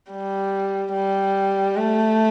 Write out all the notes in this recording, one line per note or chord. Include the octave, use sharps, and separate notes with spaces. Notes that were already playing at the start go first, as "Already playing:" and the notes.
G3
G3
A3